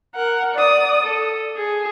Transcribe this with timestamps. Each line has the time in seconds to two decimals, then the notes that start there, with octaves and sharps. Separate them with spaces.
0.15 A#4 F#5
0.54 D5 D#6
1.03 A4
1.57 G#4